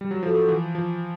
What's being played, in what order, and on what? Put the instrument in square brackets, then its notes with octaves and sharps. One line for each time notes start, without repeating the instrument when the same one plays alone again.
[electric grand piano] G3
F#3
[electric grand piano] F3 [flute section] F#4 A4 C5
[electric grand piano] E3
F3